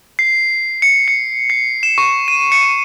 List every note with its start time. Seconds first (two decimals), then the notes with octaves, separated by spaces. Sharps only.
0.19 C7
0.82 C#7
1.08 C#7
1.50 C7
1.83 E7
1.98 C#6
2.28 D#7
2.52 C#7